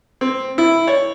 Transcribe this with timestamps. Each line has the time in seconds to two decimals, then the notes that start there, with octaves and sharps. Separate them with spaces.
0.21 C4
0.58 E4
0.88 C#5